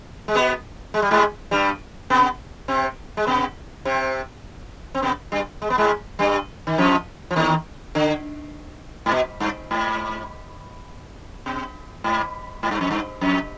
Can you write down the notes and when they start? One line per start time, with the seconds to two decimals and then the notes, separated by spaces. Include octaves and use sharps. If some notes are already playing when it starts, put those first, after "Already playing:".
0.28 G#3
0.35 B2 B3
0.94 G#3
1.02 G3
1.11 G#2 G#3
1.51 G2 G3
2.10 B2 B3
2.68 C3 C4
3.17 G#3
3.27 B2 B3
3.85 C3 C4
4.95 C4
5.02 B2 B3
5.32 G2 G3
5.62 G#3
5.70 B3
5.78 G#2 G#3
6.19 G2 G3
6.67 D#3
6.78 F2 F3
7.31 F3
7.36 D#2 D#3
7.95 D3
9.06 G#2
9.12 B2
9.40 G2
9.71 G#2
11.46 B2
12.04 G#2
12.63 G#2
12.71 G2
12.81 F2
12.91 G2
13.21 F2